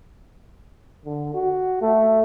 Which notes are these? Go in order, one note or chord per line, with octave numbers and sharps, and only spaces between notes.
D3
F#4
A3